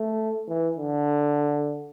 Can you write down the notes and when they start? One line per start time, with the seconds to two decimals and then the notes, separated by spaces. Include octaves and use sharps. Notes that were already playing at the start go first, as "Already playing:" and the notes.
Already playing: A3
0.48 E3
0.78 D3